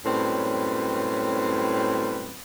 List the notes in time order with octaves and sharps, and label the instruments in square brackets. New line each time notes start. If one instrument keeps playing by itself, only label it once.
[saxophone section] F#2 A2 G3 C4 C#4 B4